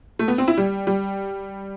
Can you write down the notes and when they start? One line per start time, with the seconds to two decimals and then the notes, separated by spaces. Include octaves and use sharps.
0.19 A3
0.28 B3
0.38 C4
0.48 E4
0.58 G3
0.87 G3